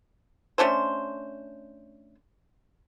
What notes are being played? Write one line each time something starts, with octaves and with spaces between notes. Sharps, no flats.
A3 C#4 D4 C5